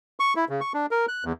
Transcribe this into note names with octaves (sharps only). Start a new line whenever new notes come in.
C#6
E4
C#3
C#6
D4
A#4
F#6
E2